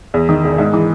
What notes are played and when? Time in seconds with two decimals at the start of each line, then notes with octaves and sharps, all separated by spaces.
0.14 E2
0.29 D#3
0.44 E1
0.58 G#2
0.73 E3